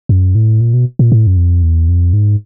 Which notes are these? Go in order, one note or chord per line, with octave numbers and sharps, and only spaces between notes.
F#2
A2
A#2
B2
A#2
A2
F#2
F2
E2
F2
G#2